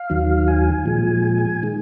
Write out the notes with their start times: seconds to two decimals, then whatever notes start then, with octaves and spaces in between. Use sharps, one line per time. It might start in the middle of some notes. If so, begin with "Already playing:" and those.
Already playing: F5
0.10 D#2 D#3 F#3
0.48 G#5
0.86 A#2 F3 G#3
1.63 D#3 G#3